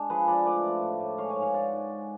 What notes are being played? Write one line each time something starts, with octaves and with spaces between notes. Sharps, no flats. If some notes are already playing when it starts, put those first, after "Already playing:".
Already playing: G#3 D4
F3 G#4 B4
F3 B4 D5
A3 B4 D5
F3
A2
A2
G#3 C#5 F5
F5 G#5
G#2
C#5 F5
G#3 D5 F#5
G#2
G#3